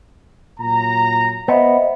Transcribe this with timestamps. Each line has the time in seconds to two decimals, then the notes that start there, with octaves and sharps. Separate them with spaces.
0.58 A#2 F#3 A#5
1.48 B3 C5 D#5 E5